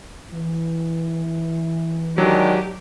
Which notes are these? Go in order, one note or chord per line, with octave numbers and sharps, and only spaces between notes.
E3
D#3 F#3 G#3 D4 G4